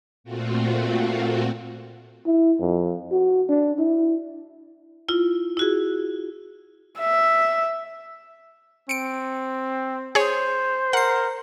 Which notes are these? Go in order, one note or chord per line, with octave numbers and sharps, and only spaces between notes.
A#2 A3 C4 F4 F#4
E4
F2
F#4
D4
E4
E4 F4
E4 F#4 G#4
E5
C4 C#7 D7
G#4 C5 C#5
A#4 F#5 C7